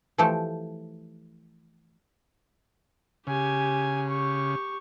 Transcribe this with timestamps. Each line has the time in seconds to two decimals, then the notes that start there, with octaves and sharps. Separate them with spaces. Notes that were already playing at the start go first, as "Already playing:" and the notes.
0.18 E3 F3 A3 G4 A4
3.27 C#3 G4 G#5
4.10 G4 C#6